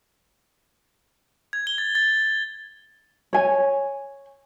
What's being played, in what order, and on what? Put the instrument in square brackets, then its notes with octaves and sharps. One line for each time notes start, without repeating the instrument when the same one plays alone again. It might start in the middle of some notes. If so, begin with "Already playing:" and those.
[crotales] G#6
G7
A6
A6
[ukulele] C#5 G#5